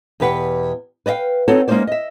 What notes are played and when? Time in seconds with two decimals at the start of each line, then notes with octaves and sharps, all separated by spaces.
0.20 E2 B2 G4 B4 F#5 G5
1.06 B4 D5 D#5 F5 G5
1.48 C4 D#4 F#4 A4 C#5
1.68 G#3 A#3 C#4 D#4 C5 D5
1.87 D#5 E5